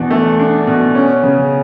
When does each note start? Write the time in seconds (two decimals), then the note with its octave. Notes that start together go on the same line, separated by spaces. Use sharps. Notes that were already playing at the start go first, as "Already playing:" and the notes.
Already playing: E2 B2 D4
0.11 A3
0.39 D4
0.67 B2
0.95 C#4
1.23 C#3